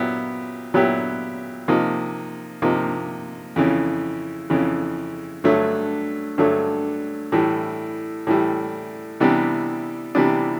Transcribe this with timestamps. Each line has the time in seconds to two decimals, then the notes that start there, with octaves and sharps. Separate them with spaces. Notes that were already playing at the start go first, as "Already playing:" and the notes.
Already playing: A#2 F#3 B3 E4 G4
0.74 A#2 F#3 B3 E4 G4
1.68 C3 F3 A#3 D#4
2.62 C3 F3 A#3 D#4
3.56 F2 C#3 E3
4.50 F2 C#3 E3
5.44 G2 D3 F#3 A3
6.38 G2 D3 F#3 A3
7.32 A2 E3 G3
8.27 A2 E3 G3
9.20 C3 E3 G3 B3 D4
10.15 C3 E3 G3 B3 D4